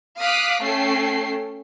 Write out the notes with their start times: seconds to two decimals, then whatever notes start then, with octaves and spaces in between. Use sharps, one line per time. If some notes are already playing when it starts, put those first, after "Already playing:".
0.19 F5 D6 D#6 F#6 B6
0.61 A3 C#4 A4 G5 C7